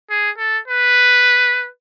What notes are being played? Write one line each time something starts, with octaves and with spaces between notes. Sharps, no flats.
G#4
A4
B4